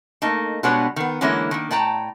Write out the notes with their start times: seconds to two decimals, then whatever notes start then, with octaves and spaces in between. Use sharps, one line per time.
0.22 A3 A#3 D#4
0.63 B2 G3 G#3 B3 D4 C#5
0.96 D#3 B3
1.21 D3 E3 G#3 A#3 C#4 E4
1.51 D#3 A#3
1.71 A2 D5 G5 A5 A#5